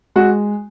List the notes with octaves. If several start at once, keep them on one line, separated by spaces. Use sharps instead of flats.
G#3 F#4